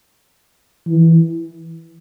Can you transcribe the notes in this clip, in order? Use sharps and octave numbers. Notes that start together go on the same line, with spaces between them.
E3